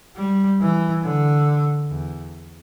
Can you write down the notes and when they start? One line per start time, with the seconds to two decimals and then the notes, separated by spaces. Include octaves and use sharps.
0.16 G3
0.60 E3
1.03 D3
1.90 E2